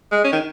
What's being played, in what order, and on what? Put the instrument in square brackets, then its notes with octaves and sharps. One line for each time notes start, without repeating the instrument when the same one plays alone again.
[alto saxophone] G#3
C#4
D#3